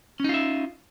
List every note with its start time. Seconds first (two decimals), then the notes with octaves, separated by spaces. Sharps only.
0.20 C#4
0.24 D#4
0.29 F4
0.34 E5